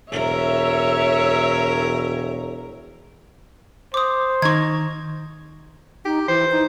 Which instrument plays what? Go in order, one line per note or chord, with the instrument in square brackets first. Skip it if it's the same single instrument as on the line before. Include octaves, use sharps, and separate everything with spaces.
[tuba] E1 [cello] A#4 [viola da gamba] C#5 [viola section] E5
[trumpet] C5 [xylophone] D6 D#6
[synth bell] D#3 D#4 [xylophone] C#6 G#6
[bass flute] D#4 [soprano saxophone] G4
[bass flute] E3 [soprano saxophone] C5
[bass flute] D#4